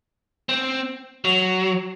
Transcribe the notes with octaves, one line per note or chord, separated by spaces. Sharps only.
C4
F#3